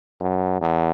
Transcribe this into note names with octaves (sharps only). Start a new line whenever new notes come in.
F#2
E2